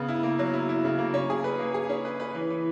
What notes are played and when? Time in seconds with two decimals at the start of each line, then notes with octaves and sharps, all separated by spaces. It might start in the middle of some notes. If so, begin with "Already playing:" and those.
Already playing: C#3 B3
0.08 E4
0.23 A#3
0.39 F#3
0.53 E4
0.69 E4
0.85 C#3
0.99 A#3
1.14 C#4
1.30 G#4
1.44 B4
1.60 A#3
1.74 G#4
1.89 C#4
2.05 B4
2.20 B4
2.35 E3
2.50 E3